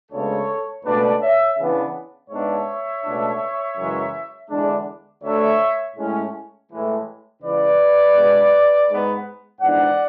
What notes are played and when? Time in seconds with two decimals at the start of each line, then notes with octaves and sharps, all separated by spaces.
0.11 D2 C#3 G#3 B3 A4 C#5
0.84 C#2 B2 A3 D4 B4 D5
1.21 C#5 E5
1.58 C#3 E3 B3 D4
2.30 G#2 G#3 B3 D4 C#5 E5
3.04 C#2 B2 A3 D4
3.77 F#2 C#3 E3 G#3
4.50 E2 D3 G#3 D4
5.23 D2 D3 A3 D4 C#5 E5
5.96 A2 G#3 C#4
6.69 A2 E3 G#3
7.41 C#2 C#3 E3 B4 D5
8.14 B2 G#3 B3 D4
8.88 G#2 G#3 B3
9.61 G#2 E3 B3 D4 D5 F#5